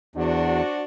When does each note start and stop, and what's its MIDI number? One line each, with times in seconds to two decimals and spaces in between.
0.16 0.61 40
0.16 0.83 62
0.16 0.83 66
0.16 0.83 72